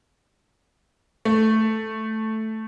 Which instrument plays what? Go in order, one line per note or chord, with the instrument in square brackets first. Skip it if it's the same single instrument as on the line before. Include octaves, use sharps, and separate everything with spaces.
[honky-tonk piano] A3